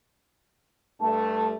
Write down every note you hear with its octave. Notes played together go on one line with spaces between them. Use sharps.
G2 A3 A5